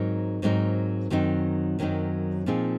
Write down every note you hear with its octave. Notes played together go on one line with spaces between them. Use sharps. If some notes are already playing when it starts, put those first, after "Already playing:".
Already playing: G#2 F#3 C4 D#4 A#4
G#2 F#3 C4 D#4 A#4
F#2 D#3 F#3 C4 D#4
F#2 D#3 F#3 C4 D#4
A#2 F3 C4 D#4 G#4